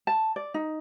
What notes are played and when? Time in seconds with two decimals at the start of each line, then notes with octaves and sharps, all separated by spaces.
0.07 A5
0.36 D5
0.54 D#4